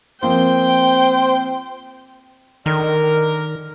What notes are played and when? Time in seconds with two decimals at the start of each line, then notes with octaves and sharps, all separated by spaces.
0.23 F3 A#3 C4 C5 G5
2.66 D3 D#3 A#4